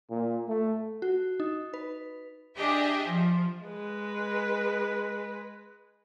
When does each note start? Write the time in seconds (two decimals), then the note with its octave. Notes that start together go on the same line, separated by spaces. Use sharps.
0.10 A#2
0.48 A3
1.02 F#4
1.40 D#4
1.74 B4
2.58 D4 G4 G#4 D#5 E5
3.08 F3
3.65 G#3 B4